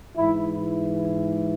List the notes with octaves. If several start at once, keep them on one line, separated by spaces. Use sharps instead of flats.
G#2 E3 E4